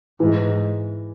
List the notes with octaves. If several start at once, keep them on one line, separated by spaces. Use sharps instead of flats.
G#2 E3